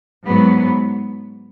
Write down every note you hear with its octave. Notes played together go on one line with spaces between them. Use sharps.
G#2 F#3 B3